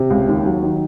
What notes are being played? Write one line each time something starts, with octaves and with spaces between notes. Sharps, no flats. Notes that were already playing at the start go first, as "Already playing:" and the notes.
Already playing: C3
C#2
D#2
F#3
D#3